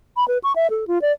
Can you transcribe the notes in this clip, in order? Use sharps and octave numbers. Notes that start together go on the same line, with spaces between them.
B5
B4
C#6
E5
A4
F4
D5